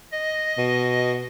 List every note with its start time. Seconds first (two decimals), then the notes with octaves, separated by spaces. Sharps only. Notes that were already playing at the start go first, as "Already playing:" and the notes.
0.12 D#5
0.58 B2